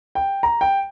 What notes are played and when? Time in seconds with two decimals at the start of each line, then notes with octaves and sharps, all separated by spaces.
0.15 G5
0.43 A#5
0.61 G5